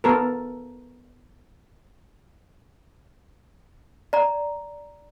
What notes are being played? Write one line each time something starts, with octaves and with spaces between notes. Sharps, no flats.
B3 A4 A#4
D5 A#5